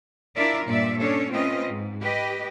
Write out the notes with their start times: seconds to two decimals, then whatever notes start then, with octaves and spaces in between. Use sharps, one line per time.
0.36 D4 E4 F4 A#4 D5 E5
0.65 G2 A#2 D5 E5
0.99 C#4 D4 A4 C#5
1.30 A3 C4 C#4 F4 B4 D#5
1.67 G#2
2.02 G4 B4 D#5